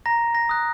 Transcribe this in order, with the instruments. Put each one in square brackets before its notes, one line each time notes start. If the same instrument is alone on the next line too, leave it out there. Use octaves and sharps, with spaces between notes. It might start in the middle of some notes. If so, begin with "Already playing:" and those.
[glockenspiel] A#5 A#6
A#6
D#6 F#6